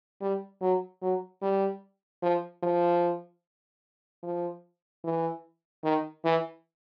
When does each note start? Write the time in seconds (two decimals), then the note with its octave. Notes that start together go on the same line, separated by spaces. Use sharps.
0.21 G3
0.61 F#3
1.02 F#3
1.42 G3
2.22 F3
2.63 F3
4.23 F3
5.04 E3
5.84 D#3
6.24 E3